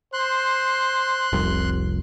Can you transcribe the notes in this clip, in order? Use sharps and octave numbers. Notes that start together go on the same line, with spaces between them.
C5 C6 F#6
F1 C2